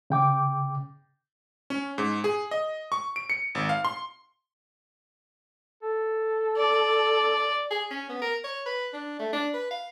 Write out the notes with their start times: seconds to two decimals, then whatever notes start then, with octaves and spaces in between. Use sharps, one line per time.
0.10 C#3 G5 D6
1.70 C#4
1.98 G#2
2.24 G#4
2.51 D#5
2.92 C#6
3.16 D7
3.30 C#7
3.55 G#1
3.69 F5
3.85 C6
5.83 A4
6.57 D5
7.71 G#4
7.91 C#4
8.09 B3
8.22 A#4
8.44 C#5
8.66 B4
8.93 D4
9.19 A3
9.33 D4
9.54 B4
9.71 F5